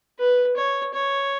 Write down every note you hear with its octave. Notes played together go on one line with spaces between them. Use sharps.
B4
C#5
C#5